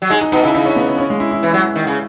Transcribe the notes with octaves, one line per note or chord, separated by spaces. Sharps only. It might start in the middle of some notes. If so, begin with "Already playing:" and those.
F#3
G#3 D#4
D#4
B2 D#4
C#3 E4
C#3 D#4
C#4
B3
C#4
C#4
G#3
E4
E4
E3
F#3
D#3
C#3